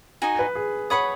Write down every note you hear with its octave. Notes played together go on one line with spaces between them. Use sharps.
D#4 F#4 D#5 G#5
B4
G#4
B4 C#5 F#5 B5 D#6